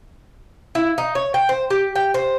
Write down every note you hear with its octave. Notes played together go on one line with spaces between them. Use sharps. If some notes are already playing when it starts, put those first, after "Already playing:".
E4
D#4
C#5
G5
C5
G4
G5
C5